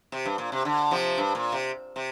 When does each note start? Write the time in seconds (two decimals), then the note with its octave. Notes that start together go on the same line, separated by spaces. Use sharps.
0.12 C3
0.25 G2
0.38 A#2
0.52 C3
0.65 D3
0.91 C3 F3
1.18 G2
1.35 A#2
1.52 C3
1.96 C3